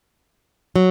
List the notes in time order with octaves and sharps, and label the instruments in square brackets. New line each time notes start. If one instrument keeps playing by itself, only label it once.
[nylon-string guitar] F#3